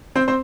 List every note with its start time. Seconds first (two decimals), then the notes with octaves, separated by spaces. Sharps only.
0.16 C4 C5
0.28 C4 C5